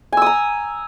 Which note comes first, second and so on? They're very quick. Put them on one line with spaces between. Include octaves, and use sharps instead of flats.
G#5 E6 D#6 A#5